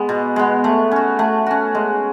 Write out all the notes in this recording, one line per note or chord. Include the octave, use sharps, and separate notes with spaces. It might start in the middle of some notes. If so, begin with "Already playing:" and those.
Already playing: G#3 B3
B2
G#3 B3
A3
C#4 F#4
A3
C#4 F#4
G#3